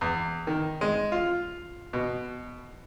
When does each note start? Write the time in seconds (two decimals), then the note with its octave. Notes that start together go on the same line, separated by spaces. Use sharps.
0.01 E2
0.47 D#3
0.81 G#3
1.12 F4
1.93 B2